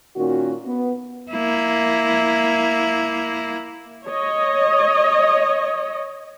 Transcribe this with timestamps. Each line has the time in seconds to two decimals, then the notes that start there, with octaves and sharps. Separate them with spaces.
0.16 A#2 D#3 C#4 F#4
0.66 B3
1.32 A#3 E4
4.05 C#5 D#5